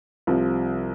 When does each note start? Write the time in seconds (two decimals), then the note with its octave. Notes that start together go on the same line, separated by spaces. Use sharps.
0.27 C2 C3 F3